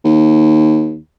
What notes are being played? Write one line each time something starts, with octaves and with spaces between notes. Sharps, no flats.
D#2